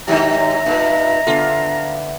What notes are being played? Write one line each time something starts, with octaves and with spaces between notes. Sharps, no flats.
G2 D#3 F#3 D#4 G4 E5 A#5
G2 A#2 D#4 B4
D3 B3 D4 F4